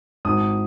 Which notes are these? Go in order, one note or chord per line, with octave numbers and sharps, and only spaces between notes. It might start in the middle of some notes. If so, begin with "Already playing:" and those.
G#1 D#6